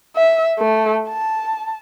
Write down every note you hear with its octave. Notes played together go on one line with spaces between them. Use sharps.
E5
A3
A5